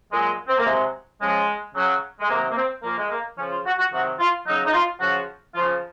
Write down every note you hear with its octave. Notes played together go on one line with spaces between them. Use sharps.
A#2 F#3 G#3
C4
A#3
C3 F#3 G#3
C#3 F3 G#3
C#3 F#3
G#3
C3 D#3 F#3 A#3
A#3
C4
A#2 F3 A#3
G#3
A#3
C#3 F3 C#4
F4
F#4
F#4
C3 D#3 F#3 F#4
F4
C#3 F#3 D#4
D#4
F4
C#3 F3 F#4
C#3 F3 F4